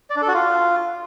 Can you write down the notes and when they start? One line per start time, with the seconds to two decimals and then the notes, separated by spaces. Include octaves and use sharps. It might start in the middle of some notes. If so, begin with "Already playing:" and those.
0.10 D5
0.16 D4
0.22 A4
0.28 F#4
0.34 F4